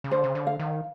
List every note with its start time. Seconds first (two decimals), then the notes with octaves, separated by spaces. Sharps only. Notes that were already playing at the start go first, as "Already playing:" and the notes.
0.04 C#3
0.11 D3 C5
0.24 C#3
0.35 D3
0.47 F5
0.59 D#3